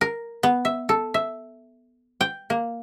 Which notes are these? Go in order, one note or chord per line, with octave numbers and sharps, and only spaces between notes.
A#4
B3
E5
A4
E5
G5
A#3